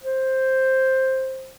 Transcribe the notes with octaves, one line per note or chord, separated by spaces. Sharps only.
C5